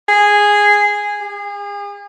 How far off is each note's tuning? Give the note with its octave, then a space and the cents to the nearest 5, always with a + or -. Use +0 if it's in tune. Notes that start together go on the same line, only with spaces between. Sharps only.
G#4 -10
G#4 -40